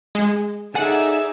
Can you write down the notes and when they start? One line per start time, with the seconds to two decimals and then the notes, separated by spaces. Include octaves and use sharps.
0.15 G#3
0.75 D#4 G#4 A4 D5 E5 F#5 G#5